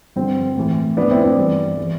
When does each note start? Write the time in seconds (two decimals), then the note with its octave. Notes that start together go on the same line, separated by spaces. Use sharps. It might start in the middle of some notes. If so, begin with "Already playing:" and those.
0.16 G2 D3 F3 C4
0.57 A2 E3
0.97 A2 F3 B3 D4
1.11 C4 E4
1.24 B3 D4
1.37 G2 E3
1.77 E3